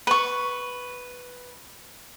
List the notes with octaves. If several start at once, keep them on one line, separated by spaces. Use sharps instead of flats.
B4 C#6